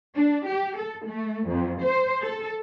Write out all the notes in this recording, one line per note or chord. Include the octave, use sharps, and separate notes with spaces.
D4
G4
A4
A3
F2
C5
A4